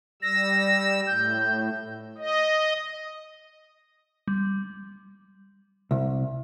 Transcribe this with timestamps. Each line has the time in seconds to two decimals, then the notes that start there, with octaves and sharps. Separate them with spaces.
0.22 G3 E6 A#6
1.07 A2 G6
2.18 D#5
4.28 G3
5.91 C2